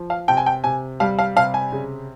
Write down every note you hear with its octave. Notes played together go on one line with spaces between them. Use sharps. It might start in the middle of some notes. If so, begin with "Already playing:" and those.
Already playing: F3
F5
C3 G5
G#5
G5
C3 G#5
G3 F5
F5
C3 F5
G#5
C#3